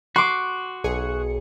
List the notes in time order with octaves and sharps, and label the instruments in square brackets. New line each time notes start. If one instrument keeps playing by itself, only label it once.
[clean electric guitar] F#4 [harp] C6 D6
[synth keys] B1 G#4 C#7